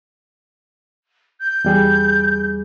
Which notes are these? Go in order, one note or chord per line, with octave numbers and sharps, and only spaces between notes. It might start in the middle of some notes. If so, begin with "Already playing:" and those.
G6
E2 G3 G#4